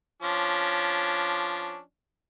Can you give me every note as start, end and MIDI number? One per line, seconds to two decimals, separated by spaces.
0.22 1.79 53
0.22 1.79 61
0.22 1.79 62